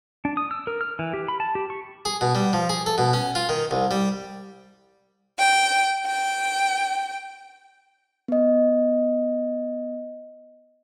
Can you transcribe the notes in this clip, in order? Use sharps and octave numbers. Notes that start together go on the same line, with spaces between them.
D4
D#6
E6
A#4
F6
E3
G4
B5
A5
G4
C#6
G#4
B2
G3
F3
G#4
A4
B2
C#4
F4
D#3
C2
G3
G5
G5
B3 D#5